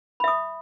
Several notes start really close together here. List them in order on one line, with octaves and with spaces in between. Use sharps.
B5 E5 D#6